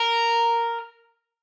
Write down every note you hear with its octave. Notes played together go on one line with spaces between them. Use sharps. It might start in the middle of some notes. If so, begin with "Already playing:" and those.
Already playing: A#4